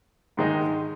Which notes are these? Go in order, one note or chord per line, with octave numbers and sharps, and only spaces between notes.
G#2 D#3 G#3 D#4